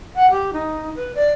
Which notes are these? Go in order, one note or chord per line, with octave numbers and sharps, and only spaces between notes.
F#5
G4
D#4
B4
D5